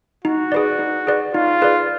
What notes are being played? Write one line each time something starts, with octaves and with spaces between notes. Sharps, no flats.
D#4 F#4
G#4 B4 D5
D#4
G#4 B4 D5
D#4 F4
G#4 B4 D5